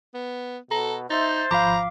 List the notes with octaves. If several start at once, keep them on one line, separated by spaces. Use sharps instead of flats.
B3
B2 A4 A#5
D#4 C5 E5 C6 A6
G#1 F3 F5 A#5 B5 D6